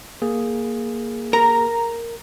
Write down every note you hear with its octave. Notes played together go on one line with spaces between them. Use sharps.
A#3 G#4
A#4 A#5